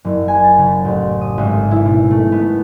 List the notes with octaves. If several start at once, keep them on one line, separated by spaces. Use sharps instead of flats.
F#1
G#5
A6
C#3
A1
D#6
G#1
E4
B2
A3
B3